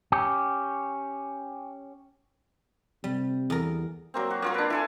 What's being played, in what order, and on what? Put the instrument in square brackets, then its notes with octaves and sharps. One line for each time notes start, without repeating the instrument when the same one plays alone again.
[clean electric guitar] C#4 G4
[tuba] C3 [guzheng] G3
[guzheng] E2 A#4
[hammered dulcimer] F#3 A#3 C4
F#4
A#3 F4 A#4
D4 B4
E4 A4 G#5